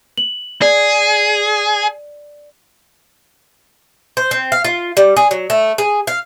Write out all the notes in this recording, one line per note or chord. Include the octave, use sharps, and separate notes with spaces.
F#7
G#4 D5
C5
C4
F5
F4
G3
G#4
F#3
A3
G#4
F5